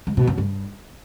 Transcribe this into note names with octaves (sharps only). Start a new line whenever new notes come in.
G#2
B2
F#2
G2